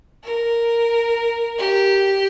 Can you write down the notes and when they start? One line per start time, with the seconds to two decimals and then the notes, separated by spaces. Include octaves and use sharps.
0.24 A#4
1.58 G4